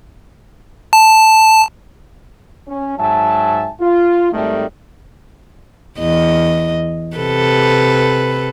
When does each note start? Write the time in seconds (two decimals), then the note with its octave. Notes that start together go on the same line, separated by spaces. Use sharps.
0.93 A5
2.68 C#4
2.99 G#2 F#3 E5 G#5 A5
3.81 F4
4.33 G#1 D#3 G3 A3
5.98 E2 D#5
7.16 C3 A4 B4